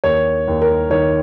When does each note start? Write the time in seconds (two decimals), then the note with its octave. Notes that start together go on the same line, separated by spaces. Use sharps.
0.04 D#2 C#5
0.48 D#2
0.62 A#4
0.90 D#3 C#5